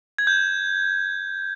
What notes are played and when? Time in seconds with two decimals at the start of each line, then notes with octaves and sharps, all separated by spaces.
0.18 G#6
0.27 G6